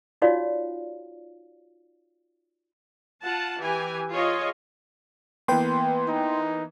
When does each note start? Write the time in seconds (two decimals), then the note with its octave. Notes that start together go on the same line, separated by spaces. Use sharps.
0.22 D#4 F4 F#4 C#5 D5 F5
3.23 F4 F#5 A5
3.60 E3 G4 G#5
4.11 F4 G#4 C#5 D#5
5.48 E3 A#3 B3 B4 G5 C6
6.08 D#4